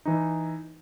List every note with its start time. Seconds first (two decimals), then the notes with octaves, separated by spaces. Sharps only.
0.05 E3 D#4